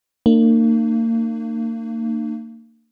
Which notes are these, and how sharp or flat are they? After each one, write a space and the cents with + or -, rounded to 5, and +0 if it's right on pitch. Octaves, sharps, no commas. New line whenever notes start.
A#3 -35 D4 +45